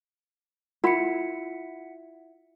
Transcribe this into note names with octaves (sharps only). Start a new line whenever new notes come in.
E4 F4 F#5 B5 B6 C#7